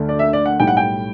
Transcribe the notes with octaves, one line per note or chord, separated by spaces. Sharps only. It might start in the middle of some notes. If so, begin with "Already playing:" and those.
Already playing: D2 D3 A3 D4
D5
E5
D5
F#5
B1 A2 G3 G5
F#5
G5